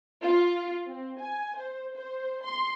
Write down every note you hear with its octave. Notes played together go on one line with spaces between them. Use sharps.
F4
C4
G#5
C5
C5
C6